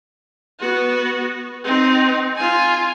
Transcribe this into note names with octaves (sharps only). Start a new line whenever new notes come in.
B3 F#4
C4 D#4
F4 G#5